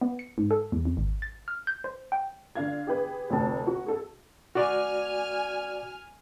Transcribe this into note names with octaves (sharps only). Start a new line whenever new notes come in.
B3
C#7
G#2
A4
E2
F2
G#1
A6
F6
G6
C5
G5
D3 F5 G#6
G4 G#4 B4
F1 D2 A5
F#4
G#4 A4
F#4 D5 G#5 F6